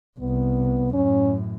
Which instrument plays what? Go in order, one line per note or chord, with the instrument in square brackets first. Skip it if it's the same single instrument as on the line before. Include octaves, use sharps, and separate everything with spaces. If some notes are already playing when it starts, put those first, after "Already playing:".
[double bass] C2 [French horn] B3
[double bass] F#2 A2 [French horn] C#4